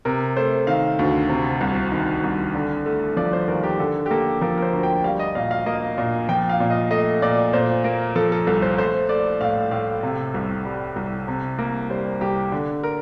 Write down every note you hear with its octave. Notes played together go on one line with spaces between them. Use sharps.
C3 A#4
A3 C5
D#3 F5
D2
C3
C2
D#3
C2
D3
A3
F3 D5
C5
D#2 A#4
G4
D3 A4
G4
A#3 A4
F3 A#4
A#4
C5
D2
G5
G3 F5
D#5
A#2 F5
F5
A#3 D#5
A#2
F3 G5
F5
A#2
D#5
A3 D#5
A#2 D5
A#2 C5
A#3 A#4
F3 A4
A4
C2 A4
C5
A3 C5
A3 D5
A2 F5
A2 F5
C3
C2
G3
C2
C3
A#3
G3 C5
C2 G4
D3
A#4